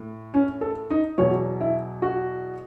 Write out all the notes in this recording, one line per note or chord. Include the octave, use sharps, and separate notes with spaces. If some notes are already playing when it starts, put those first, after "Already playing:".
Already playing: A2
C#4
A4
D#4
E2 B2 F#3 C#5
E4
F#4